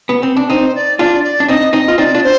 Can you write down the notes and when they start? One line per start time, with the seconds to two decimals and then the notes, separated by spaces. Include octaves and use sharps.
0.09 B3
0.23 C4
0.37 D4
0.49 C4 D#4 C5
0.75 D5
0.99 D4 F4 D5
1.24 D5
1.40 D4
1.48 C4 D#4 D#5
1.73 C4 D#4 D#5
1.88 F4
1.98 C4 D#4 D5
2.15 D4 F4
2.23 C5